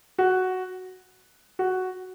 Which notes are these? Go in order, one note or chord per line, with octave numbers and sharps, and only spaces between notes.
F#4
F#4